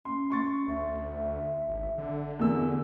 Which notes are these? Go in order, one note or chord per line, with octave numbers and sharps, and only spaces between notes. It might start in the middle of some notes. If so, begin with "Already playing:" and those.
C#4 C6
C6 C#6 A6
D2 E5
G#1
D3
E2 C3 A#4 E6